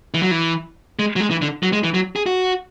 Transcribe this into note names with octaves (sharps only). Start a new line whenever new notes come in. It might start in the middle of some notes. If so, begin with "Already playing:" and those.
E3
F#3
E3
G#3
F#3
G#3
E3
D3
F#3
G#3
E3
F#3
G#4
F#4